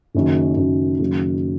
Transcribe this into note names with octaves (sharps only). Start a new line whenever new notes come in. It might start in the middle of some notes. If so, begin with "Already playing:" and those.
F#1 F#2 D#3
F#1 F#2 D#3
F#1 F#2 D#3 F#3